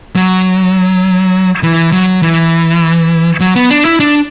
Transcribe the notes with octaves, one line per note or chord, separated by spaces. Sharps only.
F#3
E3
F#3
E3
F#3
B3
D4
E4
D4